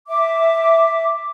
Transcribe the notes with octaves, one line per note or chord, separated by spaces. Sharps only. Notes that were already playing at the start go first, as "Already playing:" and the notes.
E5 D6